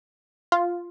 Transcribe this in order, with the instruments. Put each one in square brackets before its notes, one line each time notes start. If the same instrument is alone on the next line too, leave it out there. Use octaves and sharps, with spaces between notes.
[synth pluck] F4